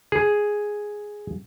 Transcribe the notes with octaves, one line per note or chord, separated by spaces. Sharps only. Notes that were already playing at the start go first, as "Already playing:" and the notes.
G#4